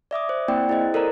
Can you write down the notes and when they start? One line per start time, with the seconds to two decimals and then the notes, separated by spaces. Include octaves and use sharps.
0.11 D5 E5 D6 D#6
0.29 C5
0.48 A#3 C4 E4 D5 G5
0.69 E4 G#4 C5 D#5
0.94 A4 A#4 C5 D5 D#5 A#5